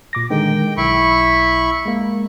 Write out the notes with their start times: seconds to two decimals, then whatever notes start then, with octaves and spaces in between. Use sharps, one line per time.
0.13 A#2 D6 A#6
0.30 D3 D#3 G#3 G5
0.77 B1 E4 B5 C#6
1.86 G#3 A#3